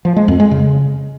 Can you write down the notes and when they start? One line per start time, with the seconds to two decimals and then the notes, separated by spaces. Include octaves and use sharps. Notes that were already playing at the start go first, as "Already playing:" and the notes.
0.05 F3
0.16 G#3
0.28 F2
0.40 G#3
0.51 C#3